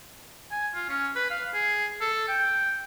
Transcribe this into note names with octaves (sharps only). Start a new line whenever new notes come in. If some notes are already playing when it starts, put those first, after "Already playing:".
G#5
F4
C#4
B4
F5
G#4
A4
G5